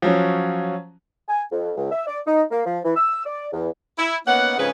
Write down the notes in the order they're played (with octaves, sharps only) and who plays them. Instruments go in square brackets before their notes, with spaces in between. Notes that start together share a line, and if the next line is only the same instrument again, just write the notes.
[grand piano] F3 F#3 C#4
[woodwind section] G#5
F2
C#2
E5
D5
D#4
A#3
F3
E3
E6
D5
E2
[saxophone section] E4
A#3 B3 C#4 D#4 F#5
F2 G#2 C#3 C#4 G#4 B4